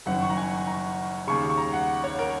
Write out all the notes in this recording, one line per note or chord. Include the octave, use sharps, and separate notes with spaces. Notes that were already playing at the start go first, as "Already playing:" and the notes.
F#1 F#2 D#3 F#5
C#6
A#5
G#5
A#5
D#2 C#3 C#6
C#6
A#5
F#5
C#5
A#4